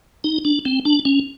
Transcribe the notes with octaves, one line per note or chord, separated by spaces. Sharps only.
D#4
D4
C4
D4
C#4